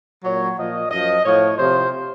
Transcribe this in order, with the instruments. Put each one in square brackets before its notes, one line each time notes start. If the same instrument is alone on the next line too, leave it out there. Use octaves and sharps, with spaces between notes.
[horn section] A#2 F#3 C#5
A#2 F3 D#5
F#2 F3 D#5
A2 F3 C#5
C3 F3 C5